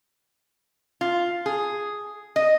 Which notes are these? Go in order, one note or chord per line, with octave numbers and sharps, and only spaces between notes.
F4
G#4
D#5